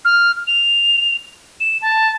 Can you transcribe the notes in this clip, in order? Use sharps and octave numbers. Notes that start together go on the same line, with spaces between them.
F6
F7
E7
A5